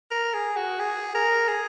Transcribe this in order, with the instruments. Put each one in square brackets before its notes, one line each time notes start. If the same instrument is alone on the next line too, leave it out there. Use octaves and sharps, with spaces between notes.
[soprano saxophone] A#4
G#4
F#4
G#4
A#4
G#4